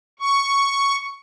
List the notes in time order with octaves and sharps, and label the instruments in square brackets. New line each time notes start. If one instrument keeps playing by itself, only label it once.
[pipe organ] C#6